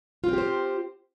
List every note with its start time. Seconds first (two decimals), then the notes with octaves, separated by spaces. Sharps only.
0.24 F4
0.28 C4
0.33 G4
0.38 C5